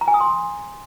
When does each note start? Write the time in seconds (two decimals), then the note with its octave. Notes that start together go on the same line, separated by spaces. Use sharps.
0.01 A#5
0.08 G#5
0.14 D#6
0.20 C6